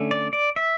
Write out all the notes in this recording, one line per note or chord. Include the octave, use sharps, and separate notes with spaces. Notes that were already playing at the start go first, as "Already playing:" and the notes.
Already playing: D3 A3 C#4
D5
D5
E5